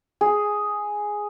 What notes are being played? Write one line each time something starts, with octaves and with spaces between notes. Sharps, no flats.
G#4